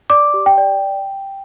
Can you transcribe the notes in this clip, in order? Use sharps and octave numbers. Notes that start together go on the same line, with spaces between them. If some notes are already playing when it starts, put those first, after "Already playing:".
D5 D6
G4
G5
D5